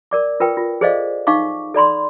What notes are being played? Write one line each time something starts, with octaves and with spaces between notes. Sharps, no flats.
A#4 D5 D6
F4 A#4 B4 G5
F4
G#4 A4 C5 D5 D#5 F5
D#4 F5 C#6 D6
A4 D5 B5 C6